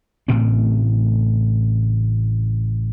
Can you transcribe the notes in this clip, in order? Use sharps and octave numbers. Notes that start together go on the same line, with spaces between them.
A1 A2 C#3 C4